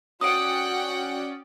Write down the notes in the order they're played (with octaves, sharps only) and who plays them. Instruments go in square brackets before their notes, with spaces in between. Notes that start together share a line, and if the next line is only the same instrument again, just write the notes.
[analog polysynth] C#4 D5 [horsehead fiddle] F#4 [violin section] F#5 G5 [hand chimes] D#6 D7